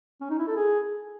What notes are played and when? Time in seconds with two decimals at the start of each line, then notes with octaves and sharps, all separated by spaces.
0.21 C#4
0.30 D#4
0.39 E4
0.48 A4
0.56 G#4